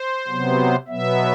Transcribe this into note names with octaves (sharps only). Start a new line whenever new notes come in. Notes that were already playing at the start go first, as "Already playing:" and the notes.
Already playing: C5
C3 F#3 B3
B2 F#3 B3 E5